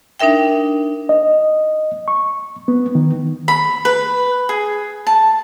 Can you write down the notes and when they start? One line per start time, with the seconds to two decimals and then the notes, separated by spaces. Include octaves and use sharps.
0.19 D4 D#4 A#4 E5 G5
1.09 D#5
2.08 C#6
2.68 B3
2.95 D#3
3.48 B5
3.85 B4
4.49 G#4
5.07 A5